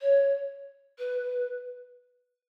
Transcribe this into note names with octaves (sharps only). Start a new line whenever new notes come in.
C#5
B4